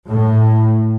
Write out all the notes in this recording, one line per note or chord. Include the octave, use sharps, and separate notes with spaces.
A2